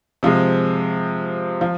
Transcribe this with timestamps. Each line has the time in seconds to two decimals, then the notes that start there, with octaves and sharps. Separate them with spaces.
0.23 C3 F3 G#3
1.61 F3